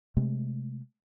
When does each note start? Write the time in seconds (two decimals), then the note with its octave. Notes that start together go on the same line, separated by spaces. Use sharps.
0.17 C3 G#3 A3